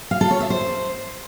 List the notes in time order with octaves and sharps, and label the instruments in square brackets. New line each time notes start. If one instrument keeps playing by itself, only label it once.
[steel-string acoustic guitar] F5
A4
C#5
E5
C5